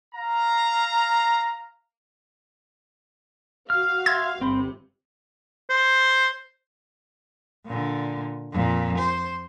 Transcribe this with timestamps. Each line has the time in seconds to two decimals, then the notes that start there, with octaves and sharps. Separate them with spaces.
0.14 F5 A#5
3.70 F#4 F5 F6
4.06 E5 C6 E6 G#6
4.41 G1 C3 C4 C5 B5
5.70 C5
7.66 A#2 D3
8.52 F2 A#2
8.99 C5